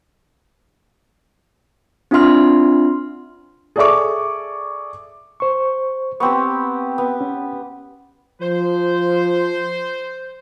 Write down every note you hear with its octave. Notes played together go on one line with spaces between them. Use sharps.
C4 D4 F4 E5 C6 F6
G#4 A4 D5 E5 C#6 D6
C5 C#6
B3 C4 G4 C#6
B3
C#4
F3 C5